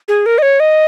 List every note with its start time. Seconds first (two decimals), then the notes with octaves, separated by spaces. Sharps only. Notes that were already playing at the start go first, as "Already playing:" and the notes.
0.08 G#4
0.26 A#4
0.38 D#5
0.42 C#5
0.60 D#5